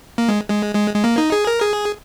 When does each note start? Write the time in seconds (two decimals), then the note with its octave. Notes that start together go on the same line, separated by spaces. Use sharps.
0.18 A#3
0.29 G#3
0.50 G#3
0.75 G#3
0.94 G#3
1.04 A#3
1.18 D#4
1.32 G#4
1.47 A#4
1.61 G#4